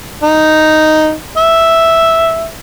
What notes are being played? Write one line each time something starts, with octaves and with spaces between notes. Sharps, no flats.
D#4
E5